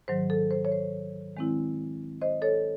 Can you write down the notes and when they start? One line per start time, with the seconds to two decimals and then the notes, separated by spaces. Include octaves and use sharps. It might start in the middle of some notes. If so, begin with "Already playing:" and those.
0.08 G#2 D#3 F#3 C5
0.30 A4
0.51 C5
0.65 C#5
0.72 C5
1.37 D#3 G#3 C4 E4
2.21 C5 D#5
2.42 A4 C#5